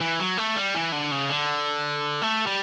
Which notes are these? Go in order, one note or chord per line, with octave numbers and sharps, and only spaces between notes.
E3
F#3
A3
G3
E3
D3
C#3
D3
A3
G3